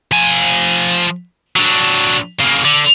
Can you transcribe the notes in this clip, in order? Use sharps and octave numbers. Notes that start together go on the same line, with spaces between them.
F3 G#5
F#3 D4
C#3 A#3
D3